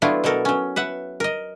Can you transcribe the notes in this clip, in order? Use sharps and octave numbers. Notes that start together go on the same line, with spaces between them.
F#3 A3 B3 D4 E4 F4
B2 F#3 B3 A4 A#4
F#3 C#4
B4 E5 F#5
A#4 D#5